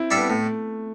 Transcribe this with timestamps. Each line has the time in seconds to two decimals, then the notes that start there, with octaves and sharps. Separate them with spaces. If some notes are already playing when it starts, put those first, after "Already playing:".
Already playing: C4 E4
0.11 G3 D4 A4 E5
0.17 B3
0.29 A2 A3